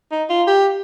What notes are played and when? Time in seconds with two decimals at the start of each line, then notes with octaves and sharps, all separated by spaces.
0.11 D#4
0.29 F4
0.47 G4